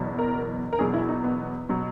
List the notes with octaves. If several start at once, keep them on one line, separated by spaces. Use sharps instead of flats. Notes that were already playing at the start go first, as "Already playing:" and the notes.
Already playing: F#1 E2 B2 F#3
A#4
A#4
E2 B2 F#3 G#4
E4
D#4
B3
B2 F#3